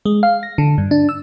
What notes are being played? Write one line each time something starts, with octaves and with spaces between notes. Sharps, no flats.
G#3
F5
A#6
D3
G2
D4
E6